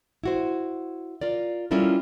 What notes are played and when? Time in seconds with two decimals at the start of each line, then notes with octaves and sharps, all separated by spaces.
0.24 E4 F#4 C5
1.21 F4 A#4 D5
1.71 G3 C#4 E4 F4 A4 A#4